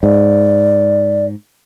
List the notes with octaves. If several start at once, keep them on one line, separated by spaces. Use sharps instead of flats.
G#2 D5